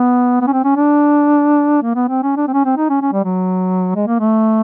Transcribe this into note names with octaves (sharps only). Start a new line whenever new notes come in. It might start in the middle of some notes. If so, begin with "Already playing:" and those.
Already playing: B3
B3
C#4
C4
C#4
D4
A#3
B3
C4
C#4
D4
C4
C#4
C4
D#4
C#4
C#4
G3
F#3
G#3
A#3
A3